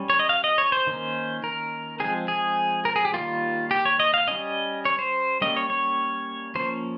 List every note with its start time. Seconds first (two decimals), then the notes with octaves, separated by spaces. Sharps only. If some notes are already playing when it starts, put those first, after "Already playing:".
Already playing: G3 C#4
0.10 C#5
0.19 D#5
0.29 F5
0.44 D#5
0.58 C#5
0.72 C5
0.87 D#3 A#3 C#4
1.44 A#4
2.00 F3 G#3 C4 G#4
2.28 G#4
2.85 A#4
2.96 G#4
3.05 G4
3.13 D#3 G3 A#3 F4
3.71 G4
3.85 C#5
4.00 D#5
4.14 F5
4.28 G3 C#4 D#5
4.85 C#5
4.99 C5
5.41 G3 A#3 C#4 D#5
5.57 C#5
5.70 C#5
6.55 F3 A#3 C#4 C5